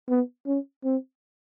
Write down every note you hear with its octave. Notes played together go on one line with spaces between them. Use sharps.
B3
C#4
C4